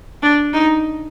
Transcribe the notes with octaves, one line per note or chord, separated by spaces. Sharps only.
D4
D#4